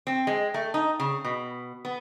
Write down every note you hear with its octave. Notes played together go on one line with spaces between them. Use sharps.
C4
G#3
A3
D#4
C#3
B2
B3